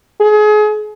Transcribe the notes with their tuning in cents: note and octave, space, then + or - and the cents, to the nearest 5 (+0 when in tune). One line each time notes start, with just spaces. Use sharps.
G#4 +30